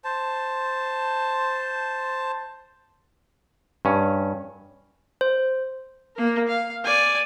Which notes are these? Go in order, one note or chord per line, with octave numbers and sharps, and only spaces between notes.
C5 A5
G2 C#4
C5
A#3 A#4
F5
D5 G#5